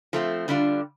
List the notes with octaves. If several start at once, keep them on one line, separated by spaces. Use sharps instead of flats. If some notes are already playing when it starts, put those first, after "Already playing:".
F3 A3 C4
D3 G3 D4 F4